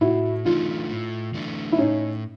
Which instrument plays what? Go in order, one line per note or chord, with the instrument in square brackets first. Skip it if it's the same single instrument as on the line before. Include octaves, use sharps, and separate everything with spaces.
[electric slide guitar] A2 [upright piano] E4 F#4
[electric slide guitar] E3 A3 D4 [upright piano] D#4 F4
[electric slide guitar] A2
E3 A3 D4
[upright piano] E4
[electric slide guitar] A2 [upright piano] C#4 D#4